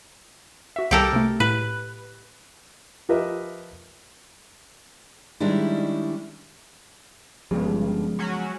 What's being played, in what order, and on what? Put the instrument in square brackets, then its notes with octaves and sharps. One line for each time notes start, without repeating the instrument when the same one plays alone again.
[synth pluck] F#4 E5
[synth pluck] C2 E6 [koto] G4 A4 A#4
[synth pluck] C3 A3
[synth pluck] A2 [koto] B4
[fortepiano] F3 G4 A#4 B4 D#5 E5
[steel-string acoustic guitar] D#3 G3 G#3 C#4 D4 E4
[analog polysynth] G1 G2 [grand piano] C#3 [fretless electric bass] F3 G#3 B3
[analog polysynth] F#3 C#4 F#4